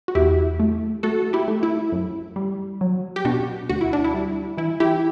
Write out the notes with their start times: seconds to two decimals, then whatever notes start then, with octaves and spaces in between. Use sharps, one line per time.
0.08 F#4
0.15 E2 E4 G4
0.60 A3
1.03 A3 F#4 A4
1.33 E4 G4
1.48 A3
1.63 E4
1.92 F#2
2.36 G3
2.81 F#3
3.16 G4
3.25 B2 D4 F#4
3.69 D2 F#4
3.81 E4
3.93 D4
4.04 E4
4.14 G3
4.57 E3 E4
4.80 E4 G4